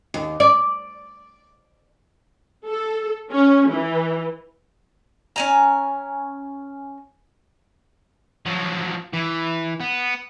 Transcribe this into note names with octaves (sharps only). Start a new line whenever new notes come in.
D#2
D5
A4
C#4
E3
C#4 G#5 A#5
F3 F#3
E3
B3